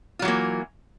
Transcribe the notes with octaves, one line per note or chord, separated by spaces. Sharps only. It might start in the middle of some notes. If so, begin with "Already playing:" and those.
E3 F#3 A#3 F4